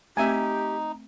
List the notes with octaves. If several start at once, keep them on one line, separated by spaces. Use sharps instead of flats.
A3 C4 D#4 G4 E5 G#5